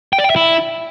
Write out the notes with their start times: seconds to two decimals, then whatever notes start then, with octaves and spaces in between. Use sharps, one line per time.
0.13 G5
0.19 D5
0.24 G5
0.30 E5
0.36 E4